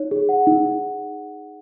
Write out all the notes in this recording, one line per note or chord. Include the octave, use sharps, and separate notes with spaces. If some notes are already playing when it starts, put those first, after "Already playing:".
Already playing: D#4 C#5
G#4
F#5
D#4
D#4